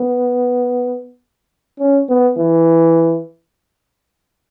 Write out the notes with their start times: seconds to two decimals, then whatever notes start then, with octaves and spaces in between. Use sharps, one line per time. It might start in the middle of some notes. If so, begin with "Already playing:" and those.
Already playing: B3
1.79 C#4
2.09 B3
2.38 E3